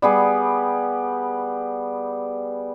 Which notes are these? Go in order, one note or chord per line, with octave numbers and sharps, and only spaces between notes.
G3 B3 G#4